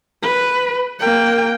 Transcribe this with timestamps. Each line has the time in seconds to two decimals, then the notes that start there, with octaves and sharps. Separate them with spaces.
0.23 B4
1.00 A#3 G5